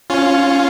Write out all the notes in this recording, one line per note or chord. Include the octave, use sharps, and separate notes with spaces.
C#4 F4